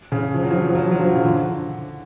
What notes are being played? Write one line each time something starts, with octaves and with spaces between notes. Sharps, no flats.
C#3
F3
F#3
F3
F#3
F3
F#3
F3
F#3
F3
F#3
C#3 F3
D3